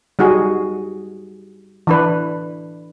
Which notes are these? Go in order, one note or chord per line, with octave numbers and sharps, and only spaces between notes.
G3 D#4 F#4 G#4
E3 D4 B4